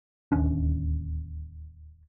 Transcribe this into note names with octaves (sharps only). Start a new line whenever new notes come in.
D1 D#2 C#4 D4